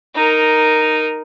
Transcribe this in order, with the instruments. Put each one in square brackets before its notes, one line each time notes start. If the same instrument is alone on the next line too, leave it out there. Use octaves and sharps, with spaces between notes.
[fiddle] D#4 A#4